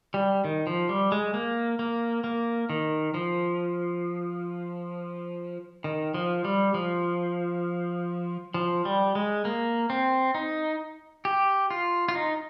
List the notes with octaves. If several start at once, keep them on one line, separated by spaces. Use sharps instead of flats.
G3
D#3
F3
G3
G#3
A#3
A#3
A#3
D#3
F3
D#3
F3
G3
F3
F3
G3
G#3
A#3
C4
D#4
G4
F4
F4
D#4